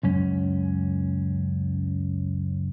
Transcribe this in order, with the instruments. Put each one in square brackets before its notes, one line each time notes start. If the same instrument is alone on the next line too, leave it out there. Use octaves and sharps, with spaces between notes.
[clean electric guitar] C#2 F#2 C#4